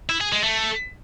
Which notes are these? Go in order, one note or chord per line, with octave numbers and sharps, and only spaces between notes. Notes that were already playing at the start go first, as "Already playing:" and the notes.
E4
G#4
G#3
A3